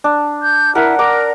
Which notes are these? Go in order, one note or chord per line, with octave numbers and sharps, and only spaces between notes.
D4
G6
E4 A#4 F#5
A#4 A#5 D6